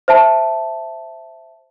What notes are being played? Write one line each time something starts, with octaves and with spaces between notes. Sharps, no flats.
C5 E5 A5